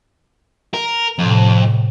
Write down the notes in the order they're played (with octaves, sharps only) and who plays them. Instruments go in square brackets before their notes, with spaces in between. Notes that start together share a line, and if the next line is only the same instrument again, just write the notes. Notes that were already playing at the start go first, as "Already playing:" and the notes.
[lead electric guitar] A#4
[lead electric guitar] F2 [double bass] A2 C3